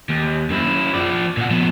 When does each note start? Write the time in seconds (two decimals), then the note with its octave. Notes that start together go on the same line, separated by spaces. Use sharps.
0.09 D#2
0.50 F#2 E4
0.95 F3 D5
1.37 A#2 F#4
1.51 F3 B3